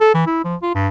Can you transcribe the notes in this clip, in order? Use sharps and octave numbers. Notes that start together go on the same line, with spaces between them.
A4
E3
E4
F3
F4
G2